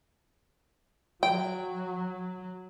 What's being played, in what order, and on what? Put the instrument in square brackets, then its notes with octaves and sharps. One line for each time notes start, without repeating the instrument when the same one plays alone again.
[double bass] F#3 [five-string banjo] G5